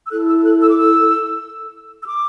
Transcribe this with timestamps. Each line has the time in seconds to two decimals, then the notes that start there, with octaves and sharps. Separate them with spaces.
0.06 E6
0.11 E4 A4 F#6
0.28 E6
0.43 F#6
0.60 E6
0.68 D6
0.76 E6
2.02 E6
2.06 D6